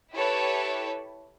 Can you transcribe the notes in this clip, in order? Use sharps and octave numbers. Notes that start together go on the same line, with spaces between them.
E4 G4 A4 B4 C#5